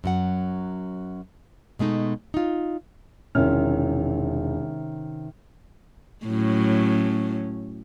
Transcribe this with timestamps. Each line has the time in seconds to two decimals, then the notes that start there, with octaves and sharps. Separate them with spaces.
0.04 F#2 F#3 F#5
1.79 B2 G#3 A3 D#4
2.34 D#4 F4
3.35 E1 C3 D#3 C#4 E4 F6
6.26 A2 F#3 C#4